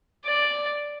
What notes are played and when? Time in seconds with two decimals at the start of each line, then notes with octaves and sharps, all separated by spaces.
0.26 D5